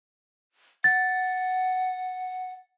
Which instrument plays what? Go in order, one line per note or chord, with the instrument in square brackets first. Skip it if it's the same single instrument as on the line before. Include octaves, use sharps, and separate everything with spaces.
[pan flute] F#5 [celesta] A6